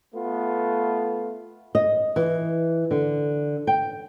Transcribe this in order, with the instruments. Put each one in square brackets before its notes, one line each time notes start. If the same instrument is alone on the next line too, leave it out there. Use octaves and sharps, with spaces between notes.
[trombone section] A3 B3 F4
[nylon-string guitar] D#5
E3
D3
G5